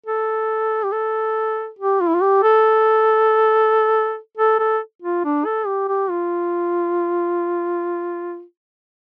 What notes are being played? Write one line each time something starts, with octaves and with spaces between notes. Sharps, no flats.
A4
G4
A4
G4
F4
E4
F4
G4
A4
A4
A4
F4
D4
A4
G4
G4
F4